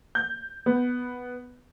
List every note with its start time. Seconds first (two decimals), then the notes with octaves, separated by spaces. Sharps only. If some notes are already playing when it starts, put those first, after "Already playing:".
0.15 G6
0.66 B3